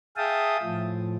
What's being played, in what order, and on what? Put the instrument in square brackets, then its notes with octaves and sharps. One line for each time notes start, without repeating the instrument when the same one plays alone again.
[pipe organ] G#4 E5 F5 G5 A5 D#6
A2 F3